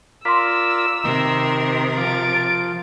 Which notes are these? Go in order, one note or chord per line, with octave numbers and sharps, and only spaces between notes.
F4 A#4 D5 C6 E6 B6
C3 D#3 A#4
F3 A6 D7